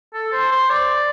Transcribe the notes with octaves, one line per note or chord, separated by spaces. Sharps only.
A4
C5
C5
D5